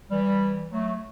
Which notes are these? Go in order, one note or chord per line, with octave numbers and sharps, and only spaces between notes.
E3 G3
F#3 A3